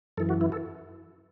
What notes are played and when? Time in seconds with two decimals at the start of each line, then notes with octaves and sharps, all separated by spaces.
0.17 F#2 E3 A4
0.29 F#4
0.41 E4
0.52 A4